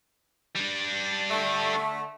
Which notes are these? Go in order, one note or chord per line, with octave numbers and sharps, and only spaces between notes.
G3 D4
D3 A3